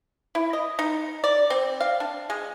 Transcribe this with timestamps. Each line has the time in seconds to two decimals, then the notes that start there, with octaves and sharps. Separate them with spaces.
0.35 E4
0.53 D#5
0.79 D#4
1.24 D5
1.50 C4
1.80 F5
2.00 D4
2.30 G#3